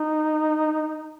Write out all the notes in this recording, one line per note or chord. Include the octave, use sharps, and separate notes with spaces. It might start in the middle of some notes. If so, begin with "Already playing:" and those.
Already playing: D#4